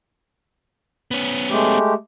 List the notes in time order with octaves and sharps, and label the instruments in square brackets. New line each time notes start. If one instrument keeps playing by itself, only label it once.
[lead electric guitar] B3 C#4
[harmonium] G#3 A3 G4